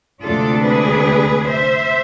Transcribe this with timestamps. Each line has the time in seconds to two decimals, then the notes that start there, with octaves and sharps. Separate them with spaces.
0.23 D2 C3 G#3 D4 F4 A4
0.64 G#4 B4
1.48 C5 E5